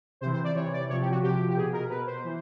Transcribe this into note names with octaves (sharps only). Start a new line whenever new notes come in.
C3 E3 C5
C5
D5
C3 E3 C#5
D5
C3 F3 C#5
G4
F#4
C3 F3 G4
G4
B2 G#4
A#4
B2 B4
C5
E3